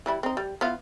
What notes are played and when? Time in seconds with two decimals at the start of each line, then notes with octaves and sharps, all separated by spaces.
0.06 E3 G3 E4
0.23 C4 D#4
0.37 G3
0.61 B3 E4 F4